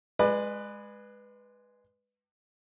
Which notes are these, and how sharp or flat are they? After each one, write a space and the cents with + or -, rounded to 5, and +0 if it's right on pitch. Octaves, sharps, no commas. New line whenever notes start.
G#3 +0 B4 +0 D5 +40